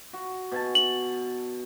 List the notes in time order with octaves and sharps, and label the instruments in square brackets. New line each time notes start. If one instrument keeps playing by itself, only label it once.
[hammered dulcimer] F#4
B2 G#5 A5
[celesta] F#7